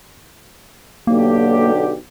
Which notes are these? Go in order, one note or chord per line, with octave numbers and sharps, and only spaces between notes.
B1 D3 A#3 G4